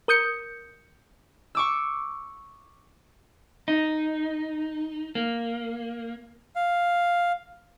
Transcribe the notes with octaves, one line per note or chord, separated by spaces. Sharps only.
A#4 D#6 G6 C#7
C#6 D6 E6
D#4
A#3
F5